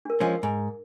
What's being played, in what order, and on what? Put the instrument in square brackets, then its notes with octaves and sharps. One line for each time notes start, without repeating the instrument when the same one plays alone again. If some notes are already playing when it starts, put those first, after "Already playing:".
[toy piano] D4 A#4
[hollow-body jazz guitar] F3 G#3 C#4
G#2